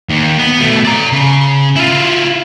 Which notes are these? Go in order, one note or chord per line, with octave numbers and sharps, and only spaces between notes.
D#2
B3
B2 A3
D5 A#5
C#3
E4 F4